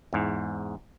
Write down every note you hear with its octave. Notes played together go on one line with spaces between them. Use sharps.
E2 G#2